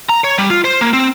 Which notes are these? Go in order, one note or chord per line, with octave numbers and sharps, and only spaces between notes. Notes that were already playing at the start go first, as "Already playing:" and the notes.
A#5
C#5
G3
F4
C5
A#3
C4